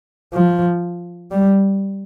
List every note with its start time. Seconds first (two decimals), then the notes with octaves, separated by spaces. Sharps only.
0.33 F3
1.31 G3